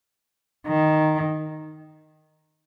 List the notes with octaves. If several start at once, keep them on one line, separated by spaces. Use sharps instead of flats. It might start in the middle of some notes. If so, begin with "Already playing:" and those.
D#3